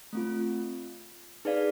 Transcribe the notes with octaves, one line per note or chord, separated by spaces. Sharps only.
A3 C4 F4
D#4 G#4 B4 D5 F5